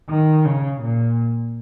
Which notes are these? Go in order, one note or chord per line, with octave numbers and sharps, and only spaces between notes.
D#3
C#3
A#2